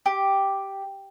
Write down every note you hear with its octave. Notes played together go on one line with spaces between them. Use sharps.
G4